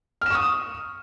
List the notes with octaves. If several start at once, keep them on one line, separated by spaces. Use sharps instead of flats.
C#6 D#6 F6 E7